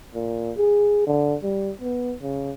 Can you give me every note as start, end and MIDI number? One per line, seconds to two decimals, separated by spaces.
0.14 0.51 46
0.58 1.06 68
1.07 1.35 50
1.43 1.71 55
1.81 2.14 59
2.22 2.52 49